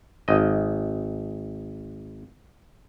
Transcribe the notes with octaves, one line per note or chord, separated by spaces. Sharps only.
G#1 D#5